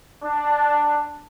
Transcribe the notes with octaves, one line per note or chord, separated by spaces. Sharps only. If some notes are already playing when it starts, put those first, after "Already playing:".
D4